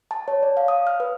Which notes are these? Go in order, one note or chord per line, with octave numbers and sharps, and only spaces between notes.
A5
C#5
D5
F5
D#6
F6
B4